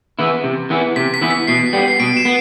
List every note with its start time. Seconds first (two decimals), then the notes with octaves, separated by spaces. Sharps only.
0.19 E3 B3 E4
0.44 C3
0.70 E3 B3 E4
0.96 C3 B6
1.14 B6
1.21 E3 B3 E4
1.30 B6
1.48 B2 C7
1.73 G3 B3
1.88 C7
2.00 B2 D7
2.17 E7
2.25 B3